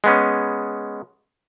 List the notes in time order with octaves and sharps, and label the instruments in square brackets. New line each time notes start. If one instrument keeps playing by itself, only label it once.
[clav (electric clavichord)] G#3 B3 C#4